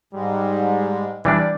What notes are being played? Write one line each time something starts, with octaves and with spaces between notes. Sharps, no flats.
G#2 G3 G#3
E3 G3 D4 D5